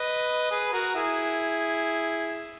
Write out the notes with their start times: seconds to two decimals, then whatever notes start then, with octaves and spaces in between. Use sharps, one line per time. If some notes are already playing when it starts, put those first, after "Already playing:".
Already playing: B4 D#5
0.51 G#4 B4
0.72 F#4 A#4
0.95 E4 G#4